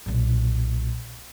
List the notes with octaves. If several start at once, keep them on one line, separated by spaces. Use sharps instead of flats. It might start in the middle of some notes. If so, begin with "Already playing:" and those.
B1 A#2